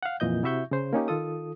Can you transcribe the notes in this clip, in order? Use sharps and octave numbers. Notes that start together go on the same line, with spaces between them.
F5 F#5
F2 A#2 E3 D#5 G6
C3 E4 F#4 E5 C#6 G6
C#3 C5
A#3 C#4 D#4 G4
D#3 F4 A4 D#6